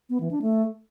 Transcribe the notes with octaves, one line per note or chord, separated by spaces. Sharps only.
B3
E3
D4
A3